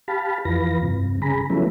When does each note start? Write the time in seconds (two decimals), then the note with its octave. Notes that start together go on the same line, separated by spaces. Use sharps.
0.08 G4 F5 A5 B5
0.45 F2 E3 F4 B4 A#6
0.83 G2 C3
1.22 C#3 G#4 A#5 B5
1.50 F3 F#3 A3 B3 C#4 E4